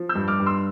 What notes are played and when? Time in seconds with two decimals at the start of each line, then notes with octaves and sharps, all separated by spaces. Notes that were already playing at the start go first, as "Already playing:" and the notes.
Already playing: F3
0.09 E6 G6
0.15 G2
0.28 D6 F6
0.40 G2
0.46 C6 E6